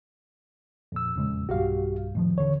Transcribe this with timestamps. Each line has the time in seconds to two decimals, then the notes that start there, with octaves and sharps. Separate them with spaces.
0.92 F2 A#2 E6
1.16 E1 C#3 G#3
1.49 B1 G2 F#4 G4 F5
2.15 F1 A2 D#3 F3
2.38 D#1 D3 E3 C#5